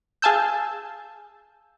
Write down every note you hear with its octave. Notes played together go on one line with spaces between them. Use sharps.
G#4 F5 G#5 A5 E6 G6